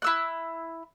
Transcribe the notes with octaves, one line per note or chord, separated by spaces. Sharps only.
E4 E6 F#6